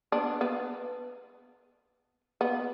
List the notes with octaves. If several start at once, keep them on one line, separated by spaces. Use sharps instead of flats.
B3 D4
B3
B3